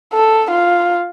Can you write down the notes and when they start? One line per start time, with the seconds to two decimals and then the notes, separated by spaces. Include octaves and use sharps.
0.14 A4
0.51 F4